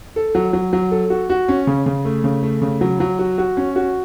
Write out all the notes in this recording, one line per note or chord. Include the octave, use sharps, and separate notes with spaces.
A4
F#3
F#3
F#3
A4
F#4
F#4
C#4
C#3
C#3
A3
C#3
A3
C#3
F#3
F#3
F#4
F#4
C#4
F#4